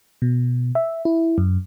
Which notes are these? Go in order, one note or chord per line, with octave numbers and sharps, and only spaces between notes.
B2
E5
E4
F#2